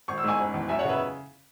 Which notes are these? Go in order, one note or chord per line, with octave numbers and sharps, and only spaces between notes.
G#1 C#6
E6
G#2 G#5 C#6
F#1
E2
F#2 E5 G#5
C#5 F#5
C#3 B4 E5